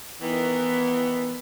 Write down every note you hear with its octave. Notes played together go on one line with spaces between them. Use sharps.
D#3 E3 B3